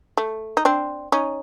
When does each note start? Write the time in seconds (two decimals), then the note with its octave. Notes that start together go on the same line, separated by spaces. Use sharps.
0.17 A3
0.57 D#4
0.65 C4 D4
1.12 C#4 D#4